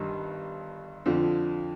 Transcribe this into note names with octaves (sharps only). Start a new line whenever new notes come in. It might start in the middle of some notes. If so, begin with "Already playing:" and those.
Already playing: G1 G2 D#3 G3
F2 D3 F3